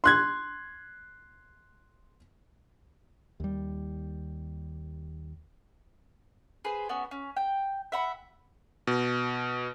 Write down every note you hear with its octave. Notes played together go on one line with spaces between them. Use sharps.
C6 F#6 G#6
D#2 G3
G#4 B4 C5
B3 C#4 F#4
C#4
G5
E5 F#5 B5
B2